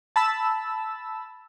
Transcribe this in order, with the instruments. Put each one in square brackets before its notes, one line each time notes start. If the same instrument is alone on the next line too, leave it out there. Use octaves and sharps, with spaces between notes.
[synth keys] A5 B5 E6